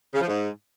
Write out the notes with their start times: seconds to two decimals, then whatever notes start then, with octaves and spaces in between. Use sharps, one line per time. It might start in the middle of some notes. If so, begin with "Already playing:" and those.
0.14 C#3
0.21 F3
0.27 G#2